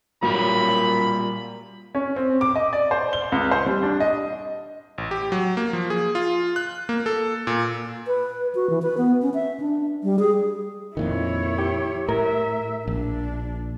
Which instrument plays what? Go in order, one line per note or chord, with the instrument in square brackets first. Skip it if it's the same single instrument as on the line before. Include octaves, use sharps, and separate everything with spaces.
[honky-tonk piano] A1 F#3 [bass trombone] A#2 [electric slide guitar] G3 A#4 [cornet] B5
[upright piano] C#4
C4
D6
D#5
D5
C5
G7
C#2
C5
G3
D4
D#5
[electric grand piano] A1
G4
F#3
A#3
F3
G#4
F4
F#6
A#3
A4
A#2
[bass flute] B4
F#4
E3
B4
B3
C#4
E5
D4
G3
G#4
[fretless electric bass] F2 A#2 D#3 [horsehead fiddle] E4 C#5
[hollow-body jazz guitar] G4
[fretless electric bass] A2 [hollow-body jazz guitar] A#4 [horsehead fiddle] E5
[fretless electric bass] A#1 [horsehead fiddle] D4